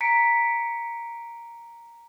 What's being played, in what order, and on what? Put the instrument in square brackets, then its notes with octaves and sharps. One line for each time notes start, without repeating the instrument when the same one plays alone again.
[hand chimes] A#5 B6 C#7 D7